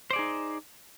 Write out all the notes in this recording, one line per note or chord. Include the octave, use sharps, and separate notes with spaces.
D#4 G#4 C5 D5